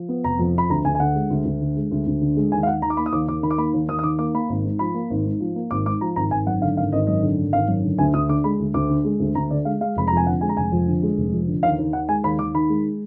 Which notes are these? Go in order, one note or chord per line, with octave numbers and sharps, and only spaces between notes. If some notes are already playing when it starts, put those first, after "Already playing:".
Already playing: F3
B3
F1 A#5
F2
F3 B5
D2 A#5
D2 G#5
G#5
D3 F#5
G#3
D2
D2
D3
G#3
D2
D2
D3
G#3
D#2 G#5
F5
D#2 F#5
D#3 A#5
D6
A#3 B5
D#6
D#2 D6
D#2 D6
D#3 B5
D6
A#3 B5
D#2
D#2 D#6
D#6
D#3 D6
A#3 D6
A#3 B5
G#1
G#2
F3 B5
A#3
G#1
G#2
F3
A#3
G#1 D6
G#2 D6
F3 A#5
G#1 A#5
G#1 G#5
F#2 F#5
D3 F5
G#1 F5
G#1 D#5
F#2 D#5
D3
G#1
G#1 F5
F#2
D3
D2 G#5
D2 D#6
D3 D6
G#3 B5
D2
D2 D6
D3
G#3
D2
D2 A#5
D3 D5
G#3 F5
G#3 F5
F1 B5
F2 A#5
G#5
D3 F#5
G#3 G#5
A#5
F1 G#5
F2
D3
G#3
F1
F2
D3
D#2 F5
D#2
D#3 F#5
G#3 G#5
D#2 B5
D#2 D6
D#3 B5
G#3